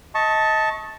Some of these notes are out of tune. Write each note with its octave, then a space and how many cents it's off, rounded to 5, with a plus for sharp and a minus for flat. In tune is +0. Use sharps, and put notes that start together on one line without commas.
D#5 +25 A5 +0 C#6 -10